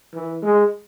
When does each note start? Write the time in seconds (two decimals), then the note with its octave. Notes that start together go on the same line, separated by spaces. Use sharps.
0.14 E3
0.43 G#3